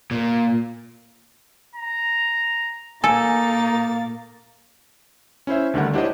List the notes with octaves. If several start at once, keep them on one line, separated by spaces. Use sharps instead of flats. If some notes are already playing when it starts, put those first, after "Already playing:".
A#2
A#5
A#2 A#3 D#4 A4 G#5 A6
C#4 E4 C5 E5
D2 D3 D#3 G3 F#5
D4 E4 G4 C5 C#5 D#5